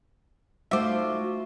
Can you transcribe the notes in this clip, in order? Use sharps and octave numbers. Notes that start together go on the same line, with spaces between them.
A3 D#4 F4 F#4 C5 E5 D6